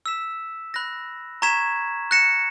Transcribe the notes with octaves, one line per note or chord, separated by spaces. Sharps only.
E6 B6 E7
B5 F#6 A#6
A#5 C#6 G#6 B6 E7
F#6 A#6 C#7 E7